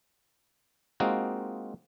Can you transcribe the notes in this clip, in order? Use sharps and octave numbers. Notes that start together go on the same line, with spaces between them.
G#3 A#3 C4 D#4 F4 F#4